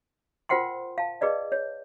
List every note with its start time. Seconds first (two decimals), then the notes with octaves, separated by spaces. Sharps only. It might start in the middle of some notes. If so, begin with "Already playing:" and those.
0.49 F4 A#4 C5 F#5 G5 C6
0.98 F5 A5
1.21 G#4 B4 D5 D#5
1.52 C#5